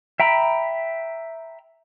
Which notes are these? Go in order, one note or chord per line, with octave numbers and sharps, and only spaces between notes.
E5 G5 A#5 B5